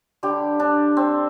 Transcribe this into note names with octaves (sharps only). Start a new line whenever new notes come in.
D3 G3 G4
D4
C4